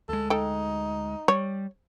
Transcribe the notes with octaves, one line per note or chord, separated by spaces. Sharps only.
D2 G#3 A4
D#4 A4 G5
G3 C#5